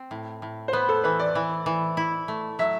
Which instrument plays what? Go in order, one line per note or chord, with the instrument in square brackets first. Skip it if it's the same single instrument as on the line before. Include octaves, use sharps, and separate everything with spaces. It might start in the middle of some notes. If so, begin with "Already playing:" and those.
Already playing: [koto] C4
A2
A2
[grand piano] C5
[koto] B3 [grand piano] B4
[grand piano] A4
[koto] E3 [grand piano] B4
[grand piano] D5
[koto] E3
E3
E4
A3
[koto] F#3 [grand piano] E5